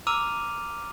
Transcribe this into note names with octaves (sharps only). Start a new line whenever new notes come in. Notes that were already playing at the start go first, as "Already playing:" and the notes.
A#5 D6 E6 F6 D#7 F7